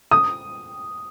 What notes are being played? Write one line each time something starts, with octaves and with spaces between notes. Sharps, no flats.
D#6